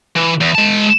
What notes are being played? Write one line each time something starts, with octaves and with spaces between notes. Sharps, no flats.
E3
E2
G#3 A5